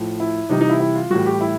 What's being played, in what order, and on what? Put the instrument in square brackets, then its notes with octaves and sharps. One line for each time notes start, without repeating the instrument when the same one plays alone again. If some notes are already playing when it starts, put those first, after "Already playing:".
Already playing: [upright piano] A2 F3
E4
C3 E3 G3 D#4
D#4
E4
E4
F4
A2 E3 G3 F#4
G4
E4